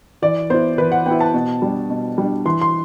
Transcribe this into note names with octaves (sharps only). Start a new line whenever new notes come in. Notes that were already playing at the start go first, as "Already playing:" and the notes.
E3 D5
B3 E4 C5
E3 B4
F#5
B3 E4 G5
A5
B2
G3 D4
B2
G3 D4
E3 C6
C6